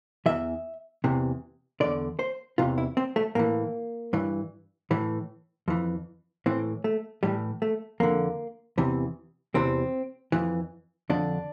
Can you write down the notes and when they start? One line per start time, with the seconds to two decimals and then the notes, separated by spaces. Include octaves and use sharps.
0.26 E2 E3 E5
1.04 E2 C3 E3
1.80 E2 D3 D5
2.19 C5
2.58 E2 C3 E3 F4
2.78 E4
2.97 C4
3.16 A3
3.35 A2 E3 A#3
4.13 G2 E3
4.91 A2 E3
5.68 F2 E3
6.46 A2 E3 C4
6.84 A3
7.23 A2 E3 G3
7.62 A3
8.00 F2 D3 A#3
8.77 E2 C3 E3
9.55 E2 C3 E3 C4
10.32 F2 E3
11.10 F2 D3 D4